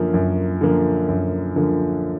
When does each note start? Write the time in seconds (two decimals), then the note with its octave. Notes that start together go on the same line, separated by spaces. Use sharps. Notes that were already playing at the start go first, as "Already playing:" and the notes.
Already playing: F#2 D3 F3 A#3
0.14 F#2
0.61 D3 F3 A#3
1.09 F#2
1.56 D3 F3 A#3